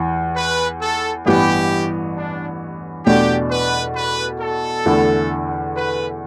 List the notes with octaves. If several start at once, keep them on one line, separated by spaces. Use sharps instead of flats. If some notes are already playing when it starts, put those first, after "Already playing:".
Already playing: E2 E3
B4
A4
A1 G2 E3 B3 G4
D4
E2 B2 A3 D4 G4
B4
B4
A4
E2 D3 A3 E4
B4